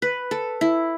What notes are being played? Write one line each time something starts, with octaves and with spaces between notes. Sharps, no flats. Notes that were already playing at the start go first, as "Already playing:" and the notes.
B4
A4
E4